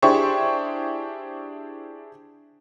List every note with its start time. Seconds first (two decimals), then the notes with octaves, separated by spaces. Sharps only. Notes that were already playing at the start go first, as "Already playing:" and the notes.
0.02 D4 E4 G4 G#4 C5 C#6